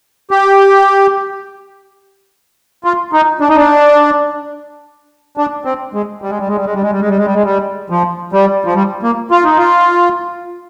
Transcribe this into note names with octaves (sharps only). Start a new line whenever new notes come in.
G4
F4
D#4
D4
D#4
D4
D4
C4
G#3
G3
G#3
G3
G#3
G3
G#3
G3
G#3
G3
G#3
G3
G#3
G3
G#3
G3
F3
G3
F3
G3
A#3
F4
D#4
F4